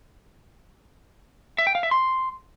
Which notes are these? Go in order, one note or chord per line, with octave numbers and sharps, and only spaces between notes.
E5
G5
F5
E5
C6